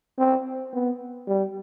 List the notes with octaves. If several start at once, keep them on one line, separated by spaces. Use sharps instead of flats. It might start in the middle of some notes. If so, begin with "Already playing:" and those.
C4
B3
G3